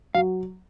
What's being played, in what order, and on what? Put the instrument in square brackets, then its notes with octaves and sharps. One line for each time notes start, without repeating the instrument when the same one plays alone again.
[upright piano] F#3 [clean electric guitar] F5